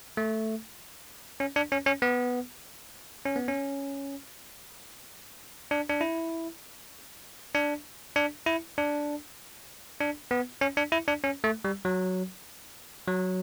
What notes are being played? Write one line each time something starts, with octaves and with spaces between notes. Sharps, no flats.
A3
C#4
D4
C#4
C#4
B3
C#4
B3
C#4
D4
D4
E4
D4
D4
E4
D4
D4
B3
C#4
D4
E4
D4
C#4
A3
G3
F#3
F#3